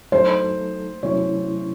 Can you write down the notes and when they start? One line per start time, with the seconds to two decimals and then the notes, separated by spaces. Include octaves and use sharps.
0.12 F#3 A3 D#4 A4 C5
1.03 C3 F#3 A3 C#4 E4 C#5